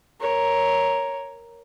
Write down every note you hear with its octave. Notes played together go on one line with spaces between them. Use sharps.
A#4 C#5